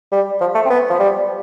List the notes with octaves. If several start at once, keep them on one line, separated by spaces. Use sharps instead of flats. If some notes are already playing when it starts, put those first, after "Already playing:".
G3
F3
A3
C4
B3
F3
G3